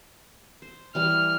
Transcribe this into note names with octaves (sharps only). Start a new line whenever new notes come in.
C5
E3 G3 F6